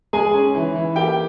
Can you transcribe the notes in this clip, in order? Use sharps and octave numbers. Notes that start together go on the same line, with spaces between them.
G#3 G#4 G#5
C#4
E3
E3
A#3 G4 G5